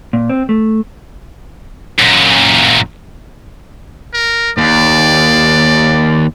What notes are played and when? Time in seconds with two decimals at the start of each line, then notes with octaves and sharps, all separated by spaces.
0.13 A#2
0.30 C4
0.49 A3
1.99 F#2 A#2
4.14 A#4
4.58 D#2 D5